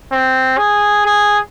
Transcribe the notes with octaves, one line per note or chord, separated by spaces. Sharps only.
C4
G#4
G#4